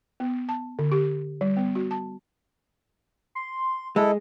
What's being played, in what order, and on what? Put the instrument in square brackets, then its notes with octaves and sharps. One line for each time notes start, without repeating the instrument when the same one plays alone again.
[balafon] B3
A5
D3
G4
G3
B3
F#4
A5
[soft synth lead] C6
[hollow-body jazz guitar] G#3 [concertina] E4 A4 [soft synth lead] D#5